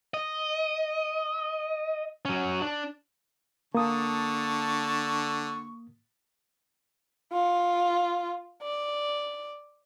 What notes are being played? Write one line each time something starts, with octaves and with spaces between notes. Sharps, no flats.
D#5
F#3 C#4
D4
D3 A#3 A5 C#6 D#6
F4
D5